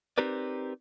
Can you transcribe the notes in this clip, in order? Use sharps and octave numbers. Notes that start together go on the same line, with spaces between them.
C4 D#4 G4 A#4 B4 D5